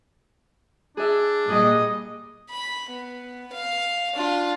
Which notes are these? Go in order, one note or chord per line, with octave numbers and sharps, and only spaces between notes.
D4 G#4 E5
A#2 G3 G#4 D#5
B5
B3
F5
D4 F4